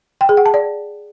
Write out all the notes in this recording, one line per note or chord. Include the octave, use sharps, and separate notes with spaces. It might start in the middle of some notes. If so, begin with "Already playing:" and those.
G5
G#4
F#5
A5
D5